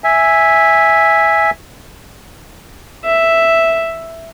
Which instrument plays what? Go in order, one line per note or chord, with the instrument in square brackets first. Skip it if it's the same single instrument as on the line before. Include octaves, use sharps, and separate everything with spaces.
[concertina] E5 G#5
[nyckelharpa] E5